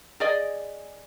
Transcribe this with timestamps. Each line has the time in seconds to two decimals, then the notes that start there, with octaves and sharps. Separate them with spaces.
0.20 G#4 D5 D#5